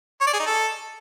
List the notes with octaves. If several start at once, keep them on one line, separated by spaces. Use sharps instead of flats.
C#5
D5
G#4
D#4
A4